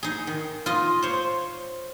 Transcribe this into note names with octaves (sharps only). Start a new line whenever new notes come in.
D#4 G#4
D#3
F4 D#5
C5 C#5